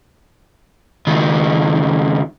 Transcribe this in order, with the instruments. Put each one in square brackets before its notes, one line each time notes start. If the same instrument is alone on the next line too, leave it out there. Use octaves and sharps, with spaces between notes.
[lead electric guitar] C#2 D#3